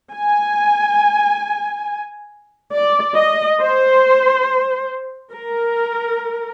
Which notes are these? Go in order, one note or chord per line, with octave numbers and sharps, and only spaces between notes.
G#5
D5
D#5
C5
A#4